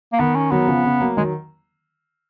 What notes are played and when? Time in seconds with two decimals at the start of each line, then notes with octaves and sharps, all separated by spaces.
0.13 A#3
0.19 D#3 B3
0.35 C#4
0.51 D#3 F#3 B3
0.68 C#3 F3
0.84 C#3
1.00 F#3 A#3
1.17 D#3 F#3 G#3